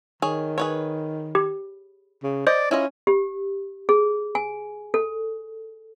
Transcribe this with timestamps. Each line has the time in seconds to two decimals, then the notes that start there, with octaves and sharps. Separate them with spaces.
0.22 D#3 G#4 C#5
0.58 G#4 B4 C#5
1.35 G4
2.23 C#3
2.47 C5 D5 D#5
2.71 C#4 E4 F4 D#5
3.07 G4
3.89 G#4
4.35 G#5
4.94 A4